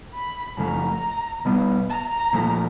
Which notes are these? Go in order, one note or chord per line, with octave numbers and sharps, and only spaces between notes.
B5
F#2 C#3 F3 A3 A#5
B2 G3 B3
A#5
A#2 F3 A3